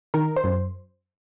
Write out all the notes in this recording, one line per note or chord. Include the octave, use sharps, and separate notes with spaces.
D#3 A#4
C5
F#2